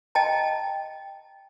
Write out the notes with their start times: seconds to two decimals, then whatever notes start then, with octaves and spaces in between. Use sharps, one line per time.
0.15 D#5 G5 A5 A#5